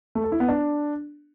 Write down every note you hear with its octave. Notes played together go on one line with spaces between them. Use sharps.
A3
A4
E4
B3
D4